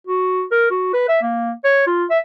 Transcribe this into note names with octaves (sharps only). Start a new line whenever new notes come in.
F#4
A#4
F#4
B4
E5
A#3
C#5
F4
E5